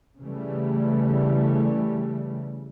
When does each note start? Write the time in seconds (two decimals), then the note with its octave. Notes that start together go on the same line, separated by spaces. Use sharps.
0.20 C#3 E3 G3 A3